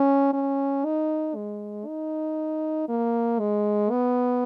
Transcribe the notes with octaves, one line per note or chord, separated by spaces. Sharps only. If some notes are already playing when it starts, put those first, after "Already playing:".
Already playing: C#4
C#4
D#4
G#3
D#4
A#3
G#3
B3